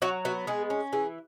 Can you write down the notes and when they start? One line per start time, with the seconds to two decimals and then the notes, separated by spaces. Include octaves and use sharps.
0.02 F#3 F#4
0.25 B3 F#4
0.47 G#3 G#4
0.70 C#4
0.93 E3 G#4